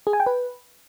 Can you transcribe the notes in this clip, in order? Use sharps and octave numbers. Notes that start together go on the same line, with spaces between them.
G#4
G#5
G5
B4